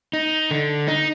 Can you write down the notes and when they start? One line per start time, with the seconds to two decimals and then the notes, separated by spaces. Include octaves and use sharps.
0.13 D#4
0.51 D3
0.88 D#4